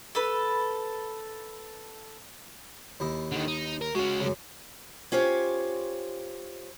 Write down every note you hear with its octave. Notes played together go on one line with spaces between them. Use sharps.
A4 B4
D#2 E4 D#5
D3 D#3
D#4
A#4
G#3 C#4 F#4
F#2 C#3
C#4 F4 G4 C5 C#5